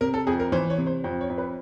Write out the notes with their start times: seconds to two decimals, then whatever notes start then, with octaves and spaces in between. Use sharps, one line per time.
0.01 C3 A#4
0.14 A4
0.27 F2 G#4
0.40 A#4
0.52 E3 C5
0.70 C#5
0.78 C3
0.87 C5
1.04 F2 C5
1.21 C#5
1.30 F2
1.38 B4